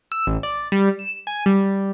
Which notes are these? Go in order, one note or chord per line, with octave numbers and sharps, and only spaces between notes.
E6
A1
D5
G3
E7
G#5
G3